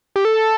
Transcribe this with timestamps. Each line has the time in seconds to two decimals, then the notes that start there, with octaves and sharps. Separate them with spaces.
0.16 G4
0.25 A4